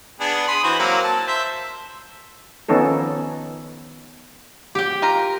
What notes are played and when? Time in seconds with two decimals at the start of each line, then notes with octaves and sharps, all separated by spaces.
0.20 B3 D4 G#4
0.47 B5 C6 D#6
0.64 E3 F#4 C5
0.79 F#3 A#3 C4
1.04 A5
1.28 C5 E5
2.69 D#3 F3 B3 C#4 D#4 A4
4.75 G4 G5
5.02 F4 A#4